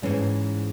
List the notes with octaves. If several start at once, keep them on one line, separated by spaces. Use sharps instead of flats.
G#2 E3 G#3 C#4